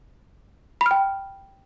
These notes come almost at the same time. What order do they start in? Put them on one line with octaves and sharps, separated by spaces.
B5 F6 G5